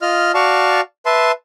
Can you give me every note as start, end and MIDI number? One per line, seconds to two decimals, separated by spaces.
0.02 0.32 65
0.02 0.32 75
0.02 0.32 89
0.34 0.81 66
0.34 0.81 74
0.34 0.81 77
0.34 0.81 81
0.34 0.81 85
1.06 1.32 71
1.06 1.32 76
1.06 1.32 81
1.06 1.32 84